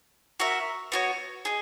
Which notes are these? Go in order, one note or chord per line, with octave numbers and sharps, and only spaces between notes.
F#4 A#4 E5
B3 F#4 C#5
G#4 D#5